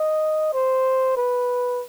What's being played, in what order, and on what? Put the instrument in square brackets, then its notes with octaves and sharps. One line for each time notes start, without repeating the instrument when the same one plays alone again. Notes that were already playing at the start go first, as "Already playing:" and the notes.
Already playing: [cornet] D#5
C5
B4